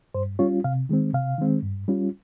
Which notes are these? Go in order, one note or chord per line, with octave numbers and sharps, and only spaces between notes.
G2 C5
G3 C#4 F4 C#5
C3 F5
D#3 G#3 C4
C3 F5
D#3 G#3 C4
G2
G3 C#4 F4